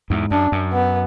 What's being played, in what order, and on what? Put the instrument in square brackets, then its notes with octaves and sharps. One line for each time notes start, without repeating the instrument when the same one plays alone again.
[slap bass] E2 G#2
[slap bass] F#2 [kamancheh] D4
[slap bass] F#2
[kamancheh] B3